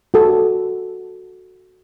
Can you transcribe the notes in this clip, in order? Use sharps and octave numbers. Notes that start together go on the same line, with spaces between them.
F#4 A4